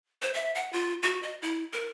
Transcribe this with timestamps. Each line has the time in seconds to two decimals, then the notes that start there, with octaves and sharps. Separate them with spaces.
0.22 C5
0.34 E5
0.55 F#5
0.73 F4
1.03 F#4
1.23 D#5
1.42 E4
1.73 A#4